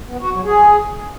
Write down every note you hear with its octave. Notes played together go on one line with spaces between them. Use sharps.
B3
F#4
F#3
G#4